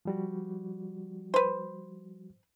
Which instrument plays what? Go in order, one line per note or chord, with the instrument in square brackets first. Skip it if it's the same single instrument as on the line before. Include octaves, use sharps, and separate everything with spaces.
[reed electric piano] F3 G3 F#4
[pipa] B4 C5